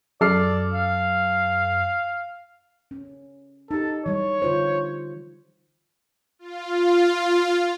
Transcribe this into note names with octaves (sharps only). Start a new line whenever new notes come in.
F#2 A4 D5 F6 C7
F5
C#4
D#4 G4 A4
E3 G3 C#5
D3 F4 C5
F4